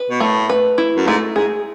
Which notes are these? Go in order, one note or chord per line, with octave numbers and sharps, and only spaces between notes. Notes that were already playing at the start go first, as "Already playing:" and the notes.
Already playing: B4
B2
A2 A3
B4
E4
F#2
G#2 A3
G#2 G#4